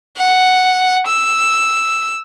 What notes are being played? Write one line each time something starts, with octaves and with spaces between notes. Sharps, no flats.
F#5
E6